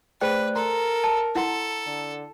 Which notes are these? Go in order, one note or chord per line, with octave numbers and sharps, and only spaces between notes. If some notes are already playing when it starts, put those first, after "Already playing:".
A3 G#4 B4 C5 D5 G5 F#6
A4 A#4 A#5 C6
A5
E4 A4 F#5 C6
D3